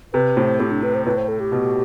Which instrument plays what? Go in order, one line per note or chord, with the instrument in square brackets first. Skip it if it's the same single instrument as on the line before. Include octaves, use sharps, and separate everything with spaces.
[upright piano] C3 [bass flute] B4
[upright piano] A2 [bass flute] C5
[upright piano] A2 [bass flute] G4
[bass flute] D4
B4
C5
[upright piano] A2 [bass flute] B4
[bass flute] C5
A4
G4
[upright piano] B2